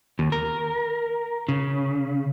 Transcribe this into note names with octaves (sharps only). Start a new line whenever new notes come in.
D#2
A#4
C#3